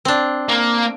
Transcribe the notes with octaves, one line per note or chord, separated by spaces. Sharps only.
C4 D4
A#3